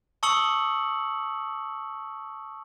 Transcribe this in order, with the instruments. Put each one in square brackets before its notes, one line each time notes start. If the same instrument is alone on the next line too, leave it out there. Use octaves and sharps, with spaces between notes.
[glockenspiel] A5 C#6 D#6 E6 C#7 F#7